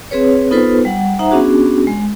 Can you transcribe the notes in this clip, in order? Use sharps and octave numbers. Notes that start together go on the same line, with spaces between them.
C4 G#4 B4 C#5
B3 D#4 F4 A4 B4 C5
G3 F#5
D#4 C5 E5 F#5 A#5
B3 C#4 D4 F#4 G#4
G#3